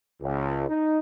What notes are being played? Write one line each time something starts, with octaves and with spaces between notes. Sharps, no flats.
C#2
D#4